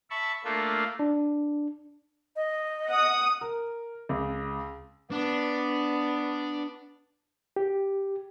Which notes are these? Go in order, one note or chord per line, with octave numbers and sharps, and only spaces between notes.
E5 A5 B5 C#6
A3 A#3 D4 F4 A4
D4
D#5
F#5 D#6
A#4
C#2
B3 D4
G4